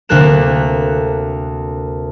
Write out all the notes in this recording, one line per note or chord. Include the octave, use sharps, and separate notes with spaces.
D2 C3 A#3 A4 F#6 E7